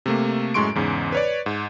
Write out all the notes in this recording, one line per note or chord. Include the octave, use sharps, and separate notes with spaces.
C3 A3 A#3
F#2 A2 G#3 C6 C#6 D7
E2 G#2 C#3
B4 C#5 D5
G#2